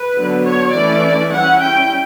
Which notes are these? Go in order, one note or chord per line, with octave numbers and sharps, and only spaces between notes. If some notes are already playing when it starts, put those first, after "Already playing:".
Already playing: B4
D3 F#3 B3 D4
C#5
E3 A3 C#4 E4 D5
G3 C#4 E4 F#5
G5